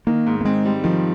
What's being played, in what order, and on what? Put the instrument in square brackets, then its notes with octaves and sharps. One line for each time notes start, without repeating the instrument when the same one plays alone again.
[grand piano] D#3 [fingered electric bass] A#3
[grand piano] G#2
[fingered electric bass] A#3
[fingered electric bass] G#3 [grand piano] C4
[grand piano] G3
[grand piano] D#3 [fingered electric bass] F3